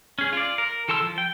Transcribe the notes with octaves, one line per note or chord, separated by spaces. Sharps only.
C#4 G#4
F4 D5
A#4
E3 A4 A5 C6 E6
F3
G5